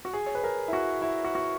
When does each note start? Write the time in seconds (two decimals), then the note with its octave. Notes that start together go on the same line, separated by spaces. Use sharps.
0.05 F#4
0.13 G#4
0.26 C#5
0.35 B4
0.44 A#4
0.68 E4
0.73 F#4
1.02 E4
1.24 F#4
1.35 F#4